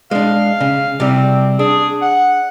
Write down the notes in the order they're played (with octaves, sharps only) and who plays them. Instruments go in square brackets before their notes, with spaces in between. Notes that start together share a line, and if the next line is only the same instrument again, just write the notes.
[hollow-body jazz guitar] G#3 D4 [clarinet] F5
[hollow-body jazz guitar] C#3
[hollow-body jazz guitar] C3 G3 [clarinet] C4
[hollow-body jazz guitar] D4 [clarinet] G#4
[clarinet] F#5